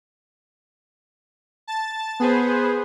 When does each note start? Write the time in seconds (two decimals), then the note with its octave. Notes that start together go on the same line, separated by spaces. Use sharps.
1.67 A5 A6
2.20 B3 G#4 B4 C5